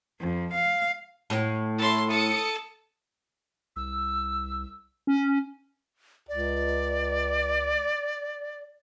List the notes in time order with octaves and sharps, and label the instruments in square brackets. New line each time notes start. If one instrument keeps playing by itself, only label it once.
[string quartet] F2
F5
[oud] A2
[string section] E4 C#5 [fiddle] A4 C6
[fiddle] A4 [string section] D#6 C#7
[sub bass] C2 [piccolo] E6
[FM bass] C#4
[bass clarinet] C#2 [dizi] D5